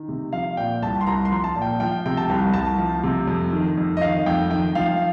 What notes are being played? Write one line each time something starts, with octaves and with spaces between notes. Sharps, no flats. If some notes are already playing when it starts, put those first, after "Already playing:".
Already playing: D#3
C3
F3 F5
A#2 G5
C2 A5
C6
C2 A#5
C6
F3
A5
A#2
G5
F3 G5
C3 G5
A5
C2
C2 A5
F3
C3
F2
D#3
F2
D#5
D#3 F5
F2 G5
D#3 G5
F3 F5